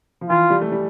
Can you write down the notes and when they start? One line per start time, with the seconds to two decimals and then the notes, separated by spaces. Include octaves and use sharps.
0.21 F3
0.29 E3 F4
0.50 G3
0.61 A3
0.72 G3